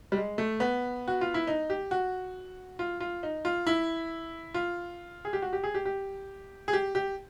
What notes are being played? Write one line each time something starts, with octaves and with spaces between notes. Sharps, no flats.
G3
G#3
A3
B3
F#4
F4
E4
D#4
G4
F#4
F4
F4
D#4
F4
E4
F4
G#4
G4
F#4
G4
G#4
G4
G4
G#4
G4
G4